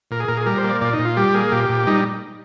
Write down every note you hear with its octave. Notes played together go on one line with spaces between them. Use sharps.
A#2 A#4
G#4
A#2 A#4
G#4
G3 A#4
C5
A#3 D5
A#2 D5
D#4
A#2
F4
G3 G4
A#3 G#4
A#2 G4
A#2
G3 D#4